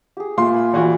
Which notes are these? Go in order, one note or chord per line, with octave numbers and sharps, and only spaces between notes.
G4 G#4
A#2 F4 E5 C6
G#5 B5
A#1 E3 F#4